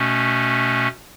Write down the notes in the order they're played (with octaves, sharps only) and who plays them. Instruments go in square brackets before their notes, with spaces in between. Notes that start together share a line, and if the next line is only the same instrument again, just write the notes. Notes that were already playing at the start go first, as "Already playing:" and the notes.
Already playing: [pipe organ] B2 A3 C#4